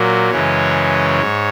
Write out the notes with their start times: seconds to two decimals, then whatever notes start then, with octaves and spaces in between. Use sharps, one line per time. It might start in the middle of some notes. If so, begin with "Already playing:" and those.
Already playing: A#2 F#3 A#3
0.30 F#2 C#3 E3 G#3 C#5
1.21 G#2